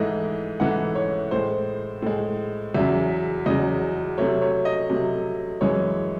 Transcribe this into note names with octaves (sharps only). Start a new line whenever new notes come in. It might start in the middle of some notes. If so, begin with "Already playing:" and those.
Already playing: G#2 E3 A3 D#5
G#2 E3 A3 F#5
C#5
A2 G#3 C5
A2 G#3
E2 C#3 F#3 E5
E2 C#3 F#3 D#5
C3 F#3 A3 C#5
C#5
D#5
C3 F#3 A3
F#2 E3 G#3 C#5